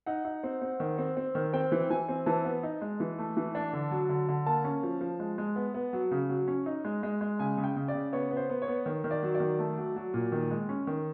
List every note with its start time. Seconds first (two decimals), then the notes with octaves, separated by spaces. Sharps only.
0.06 D#4 F#5
0.25 D#4
0.43 C4
0.62 C4
0.80 D#3
0.98 C4
1.17 C4
1.35 D#3
1.53 C4 G5
1.72 E3
1.90 E3 G#5
2.09 C4
2.26 E3 A5
2.45 B3
2.63 D#4
2.81 G#3
3.00 E3
3.18 A3
3.37 E3
3.55 D4
3.73 D3
3.91 F#3
4.09 D3
4.28 D3
4.46 A#3 A5
4.64 C#4
4.83 F3
5.01 F3
5.20 G#3
5.38 G#3
5.56 B3
5.74 B3
5.93 F#3
6.11 C#3
6.29 F#3
6.48 C#4
6.66 D#4
6.84 G#3
7.03 G#3
7.21 G#3
7.39 C#3 G#5
7.57 C#3
7.64 G5
7.76 C#3
7.88 D5
7.94 C#3
8.13 B3 C#5
8.31 B3
8.37 C5
8.49 B3
8.62 C#5
8.68 B3
8.86 D#3
9.04 D#3
9.11 D5
9.23 F#3
9.35 D5
9.40 D#3
9.59 A3
9.78 F#3
9.96 F#3
10.14 A#2
10.32 D#3
10.51 G#3
10.69 C#4
10.87 D#3